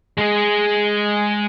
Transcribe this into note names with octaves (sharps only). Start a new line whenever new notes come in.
G#3 G#4